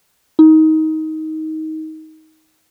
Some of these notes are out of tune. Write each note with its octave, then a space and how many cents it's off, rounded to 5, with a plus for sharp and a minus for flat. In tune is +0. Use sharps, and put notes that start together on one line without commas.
D#4 +20